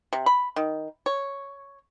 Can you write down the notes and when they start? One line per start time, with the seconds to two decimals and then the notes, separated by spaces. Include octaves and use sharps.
0.13 C3
0.26 B5
0.56 D#3
1.06 C#5